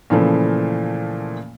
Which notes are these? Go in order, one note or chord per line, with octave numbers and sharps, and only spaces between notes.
A#2 C#3 E3 F3 A3